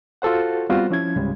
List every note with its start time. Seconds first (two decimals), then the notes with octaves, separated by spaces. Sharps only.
0.22 F4 F#4 A4 C5 F#5
0.70 G3 B3 C4 F4 F#4 C5
0.90 F3 C#4 E4 G#6
1.16 C#2 G#2 C#3 G3 G#3